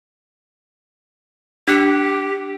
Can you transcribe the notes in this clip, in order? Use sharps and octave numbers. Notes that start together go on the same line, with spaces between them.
D4 G4 F#6 C#7